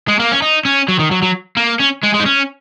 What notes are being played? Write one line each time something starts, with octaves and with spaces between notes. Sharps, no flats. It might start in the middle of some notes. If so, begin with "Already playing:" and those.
G#3
A#3
C#4
D#4
C#4
F#3
D#3
F#3
F#3
A#3
C#4
G#3
G#3
D#4
C#4